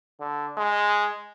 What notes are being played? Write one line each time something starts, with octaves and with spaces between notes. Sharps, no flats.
D3
G#3